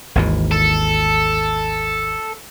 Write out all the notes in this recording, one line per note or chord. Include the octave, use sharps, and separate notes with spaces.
G#1 D#2 E3
A4